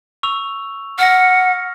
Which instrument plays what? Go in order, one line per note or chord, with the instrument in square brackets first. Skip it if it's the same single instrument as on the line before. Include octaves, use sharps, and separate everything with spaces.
[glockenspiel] C#6 E6 F7
[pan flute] F#5 [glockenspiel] F6 A#6